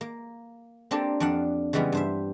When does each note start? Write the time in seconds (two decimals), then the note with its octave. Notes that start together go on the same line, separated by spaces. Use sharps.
0.01 A#3
0.91 A#3 C4 D4 G4 A4
1.20 F2 D4 F5 F#5
1.73 C#3 E3 G3 G#3 B3 C#4
1.92 G2 C5 E5